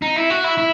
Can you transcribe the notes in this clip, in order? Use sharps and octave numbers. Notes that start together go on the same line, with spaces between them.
D#4
E4
F#4
E4
E4